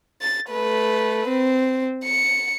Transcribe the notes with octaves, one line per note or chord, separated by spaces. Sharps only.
A6
A3 B4
C4
C#7